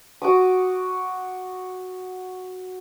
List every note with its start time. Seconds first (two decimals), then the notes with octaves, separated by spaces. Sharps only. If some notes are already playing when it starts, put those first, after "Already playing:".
0.22 F#4 D6 D#6